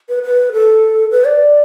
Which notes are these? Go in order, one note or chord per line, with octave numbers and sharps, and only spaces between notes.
B4
B4
A4
B4
D5